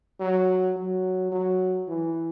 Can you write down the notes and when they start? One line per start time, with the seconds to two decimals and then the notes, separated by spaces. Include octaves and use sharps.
0.20 F#3
0.77 F#3
1.32 F#3
1.88 E3